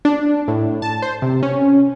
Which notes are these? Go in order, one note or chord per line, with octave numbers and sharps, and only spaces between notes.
D4
A2
A5
C5
C3
C#4